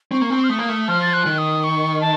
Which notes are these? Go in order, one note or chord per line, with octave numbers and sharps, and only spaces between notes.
C4 C#6
A#3
C4
F6
A3 D#6
A#3
A3
F3 F6
A6
F#6
D#3
D#6
C#6
A5